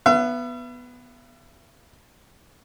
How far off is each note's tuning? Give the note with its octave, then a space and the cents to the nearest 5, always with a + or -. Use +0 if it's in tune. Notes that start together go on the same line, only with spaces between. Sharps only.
B3 +0 E5 +40